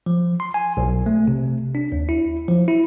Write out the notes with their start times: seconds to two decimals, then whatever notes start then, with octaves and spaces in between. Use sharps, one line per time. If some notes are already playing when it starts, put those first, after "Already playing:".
0.06 F3
0.40 C6
0.54 G#5
0.77 B1
1.06 A3
1.28 C3
1.75 D4
1.92 D#2
2.09 E4
2.48 F3
2.68 E4